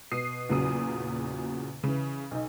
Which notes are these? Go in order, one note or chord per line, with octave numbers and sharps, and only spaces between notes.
B2 D#6 C7
E2 A#2 C#3 F#3 D#6
C#3 E3
B1 D#4